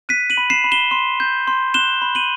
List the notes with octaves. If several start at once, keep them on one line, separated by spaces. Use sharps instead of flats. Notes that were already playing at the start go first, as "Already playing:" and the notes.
F#6 B6 D#7
D#7 F#7
B5
C7 E7
B5
E7 G7
C6
G6
C6
F#6 E7 G7
B5
D#7 F#7